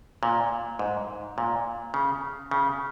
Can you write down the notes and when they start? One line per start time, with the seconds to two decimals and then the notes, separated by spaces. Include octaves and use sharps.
0.23 A#2
0.79 G#2
1.38 A#2
1.94 C#3
2.51 C#3